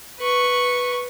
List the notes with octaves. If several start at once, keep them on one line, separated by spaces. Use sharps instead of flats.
B4 C#6